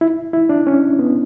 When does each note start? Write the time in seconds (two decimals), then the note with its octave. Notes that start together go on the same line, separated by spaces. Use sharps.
0.01 E4
0.33 E4
0.49 D4
0.67 C#4
0.99 B3